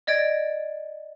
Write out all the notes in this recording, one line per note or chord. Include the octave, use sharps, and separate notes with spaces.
D5 D#5 G#6 A6 D7